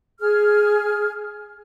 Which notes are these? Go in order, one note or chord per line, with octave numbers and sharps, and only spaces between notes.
G#4 F6